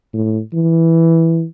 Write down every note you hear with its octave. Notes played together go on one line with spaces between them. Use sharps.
A2
E3